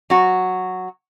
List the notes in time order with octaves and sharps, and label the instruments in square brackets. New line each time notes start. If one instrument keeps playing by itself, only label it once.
[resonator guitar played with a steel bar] F#3 F#4